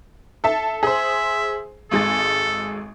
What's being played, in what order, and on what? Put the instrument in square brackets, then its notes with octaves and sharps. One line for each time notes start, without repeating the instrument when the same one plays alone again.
[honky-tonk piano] A4 E5 A5
[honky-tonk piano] G#4 C5 [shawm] E5
[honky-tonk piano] G#1 G#3 A6 [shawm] A4